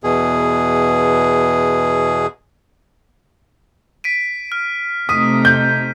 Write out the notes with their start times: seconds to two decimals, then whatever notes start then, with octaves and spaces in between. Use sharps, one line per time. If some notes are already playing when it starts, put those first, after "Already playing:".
0.04 E2 B2 G#4
4.04 B6 D7 D#7
4.52 F6
5.09 C3 A3 D#4 D#6 B6 D#7
5.45 G6